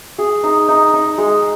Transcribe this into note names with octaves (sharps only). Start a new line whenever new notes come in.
G#4
D#4
D#4
D#4
G#3